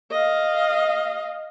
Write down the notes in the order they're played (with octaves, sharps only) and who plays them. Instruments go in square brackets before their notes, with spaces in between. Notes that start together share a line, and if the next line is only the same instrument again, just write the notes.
[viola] D#5 F5